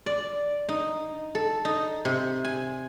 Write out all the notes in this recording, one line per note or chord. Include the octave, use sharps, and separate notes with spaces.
D5
D#4
A4
D#4
C3
G#5